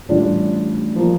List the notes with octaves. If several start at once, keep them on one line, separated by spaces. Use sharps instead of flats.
A1 A2 G3 D4 F4
F3 A#3